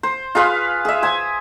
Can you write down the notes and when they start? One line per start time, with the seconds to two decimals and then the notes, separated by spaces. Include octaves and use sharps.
0.03 C5
0.35 F4 G#4 B4 F5
0.85 G#4 E5
1.02 C5 G#5